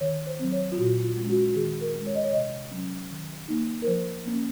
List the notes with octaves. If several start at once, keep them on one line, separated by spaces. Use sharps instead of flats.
D#3 C#5
C5
F#3 C4
C#5
F4
A#2 F#4
F4
G#3 C#4
F#4
F#4
D#3 G#4
A#4
G#3 C#4
C#5
D#5
C#5
C3 D#5
F#3 C#4
D#3
A#3 D#4
A#4
F3 C5
A#3 C#4